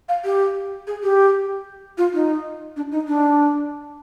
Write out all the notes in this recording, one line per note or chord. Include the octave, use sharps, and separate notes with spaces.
F5
G4
G#4
G4
F4
D#4
D4
D#4
D4